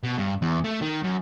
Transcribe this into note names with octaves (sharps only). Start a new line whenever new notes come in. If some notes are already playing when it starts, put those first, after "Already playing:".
B2
G2
E2
A3
D#3
F#2